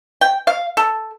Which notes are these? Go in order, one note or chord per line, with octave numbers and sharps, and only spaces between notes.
G5
F5
A4